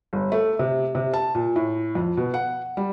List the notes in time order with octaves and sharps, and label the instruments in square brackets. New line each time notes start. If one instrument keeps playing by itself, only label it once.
[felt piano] G1
A3
C3
C3
A5
A#2
A2
F2
B2
F#5
G3